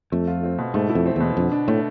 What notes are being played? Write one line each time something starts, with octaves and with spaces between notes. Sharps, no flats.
F2 A3
F4
C4
B2
G#2 A3
E4
F2
C4
E2 B2
F2 D3
D4
A2 A3